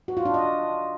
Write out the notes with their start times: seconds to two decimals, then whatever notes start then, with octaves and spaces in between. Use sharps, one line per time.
0.08 F#4
0.17 F4
0.25 D4
0.34 D#5